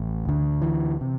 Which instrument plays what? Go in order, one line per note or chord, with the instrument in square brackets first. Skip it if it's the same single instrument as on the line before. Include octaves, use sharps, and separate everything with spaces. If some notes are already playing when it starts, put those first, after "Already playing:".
Already playing: [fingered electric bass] A1
D2 D3
E3
C3